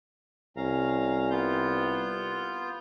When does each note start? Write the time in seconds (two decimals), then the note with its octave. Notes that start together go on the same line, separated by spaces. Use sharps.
0.57 C2 C#4 F5 A#5
1.31 B3 F4 G6